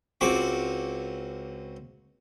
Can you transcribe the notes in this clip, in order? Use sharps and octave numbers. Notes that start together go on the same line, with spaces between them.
C#2 C4 F#4 D6